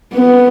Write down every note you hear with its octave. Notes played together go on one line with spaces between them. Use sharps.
B3